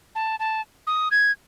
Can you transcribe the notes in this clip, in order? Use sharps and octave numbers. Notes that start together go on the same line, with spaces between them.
A5
A5
D#6
G#6